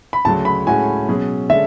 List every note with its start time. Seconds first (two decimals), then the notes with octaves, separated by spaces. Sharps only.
0.13 B5
0.25 D2 C#3 F#3 A5
0.45 B5
0.66 A2 G#3 C#4 F#4 G#5
1.08 B2 F#3 C#4 G#4
1.50 D3 G#3 C#4 A4 E5